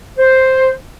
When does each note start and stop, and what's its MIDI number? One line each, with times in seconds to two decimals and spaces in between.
0.18 0.71 72